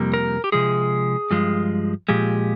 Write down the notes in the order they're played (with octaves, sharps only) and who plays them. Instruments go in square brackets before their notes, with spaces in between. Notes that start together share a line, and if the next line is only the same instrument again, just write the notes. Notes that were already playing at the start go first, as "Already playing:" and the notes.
Already playing: [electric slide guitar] F2 C3 G3 A#3
A#4
G4
C3 F3 G#3 G#4
G2 F3 G#3
A#2 F3 G#3 G4